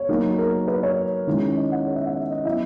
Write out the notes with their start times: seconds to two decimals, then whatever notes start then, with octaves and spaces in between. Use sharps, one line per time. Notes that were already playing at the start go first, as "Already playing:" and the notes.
Already playing: C#5
0.09 F#3 A#3 D#4
0.38 A#4
0.68 B4
0.83 C#5
1.27 D#3 G#3 C#4 E4
1.57 D#5
1.72 F#5
1.87 C#5
1.96 E5
2.06 F#5
2.15 E5
2.31 D#5
2.44 F#3 B3 E4 E5